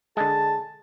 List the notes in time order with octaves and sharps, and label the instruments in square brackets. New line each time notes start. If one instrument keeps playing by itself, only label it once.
[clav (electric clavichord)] D3 G#3 [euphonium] G#4 [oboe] A5